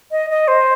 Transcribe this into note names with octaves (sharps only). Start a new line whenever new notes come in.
D#5
D#5
C5